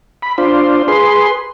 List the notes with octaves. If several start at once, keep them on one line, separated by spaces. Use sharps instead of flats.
B5
D4 F4 C5
G#4 B4 C6